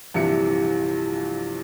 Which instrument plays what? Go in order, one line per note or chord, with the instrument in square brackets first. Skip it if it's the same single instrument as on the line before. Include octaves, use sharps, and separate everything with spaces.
[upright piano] A#1 G2 C3 E3 E5 C#7